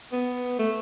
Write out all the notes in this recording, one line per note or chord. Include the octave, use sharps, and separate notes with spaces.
B3
A3